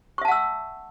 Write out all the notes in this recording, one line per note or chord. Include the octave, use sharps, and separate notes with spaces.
E5 F#5 A5 C#6 E6